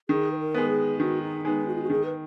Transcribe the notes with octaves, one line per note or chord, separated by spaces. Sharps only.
D#3 G#4
B4
A#4
G#3 B3
G#4
D#3 F#4
D#4
G#3 B3 D#4
F#4
F4
F#4
D#3 G#4
B4